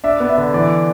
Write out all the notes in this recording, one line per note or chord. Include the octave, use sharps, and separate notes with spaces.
D4 E5
B3
E5
D3
E3 D5